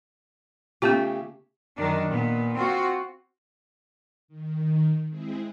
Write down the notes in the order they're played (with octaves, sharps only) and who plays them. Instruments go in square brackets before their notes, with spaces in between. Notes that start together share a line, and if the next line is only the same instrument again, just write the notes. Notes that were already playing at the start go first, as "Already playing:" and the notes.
[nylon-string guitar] C#3 A3 G4 [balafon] B3 C#4 F4
[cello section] F#2 D#3 D4
A#2 B3
C4 F4 F#4
[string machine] D#3
G#3 C4 E4 G#4